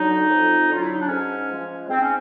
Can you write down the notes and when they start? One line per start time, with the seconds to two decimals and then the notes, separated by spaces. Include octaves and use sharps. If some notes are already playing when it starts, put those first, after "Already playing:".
Already playing: D3 F#3 D#4
0.29 F2
0.69 D3 F#3 F4
0.81 E4
0.90 D#4
1.00 D4
1.09 G#2 C#4
1.49 F3 G#3
1.89 G#2 C4
2.01 C#4